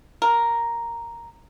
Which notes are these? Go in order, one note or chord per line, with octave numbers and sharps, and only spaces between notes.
A#4